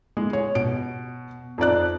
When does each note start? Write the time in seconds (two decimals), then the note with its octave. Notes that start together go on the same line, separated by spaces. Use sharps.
0.17 G#3 E4
0.33 C#5
0.55 B2 D7
1.58 F2 D#4 D5 F#6